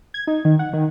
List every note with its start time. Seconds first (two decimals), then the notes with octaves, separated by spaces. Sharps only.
0.14 G#6
0.27 D#4
0.45 D#3
0.59 F#5
0.73 D#3